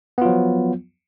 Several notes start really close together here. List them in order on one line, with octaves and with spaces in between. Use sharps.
B3 F4 F#3 F3